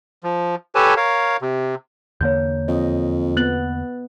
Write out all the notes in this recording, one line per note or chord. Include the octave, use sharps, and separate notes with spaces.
F3
G4 A4 B4 C#5 G#5 A5
A#4 C#5 F5
C3
E2 D3 A#3 C#5 G6
F2 D#5
B3 F#6 A6 F#7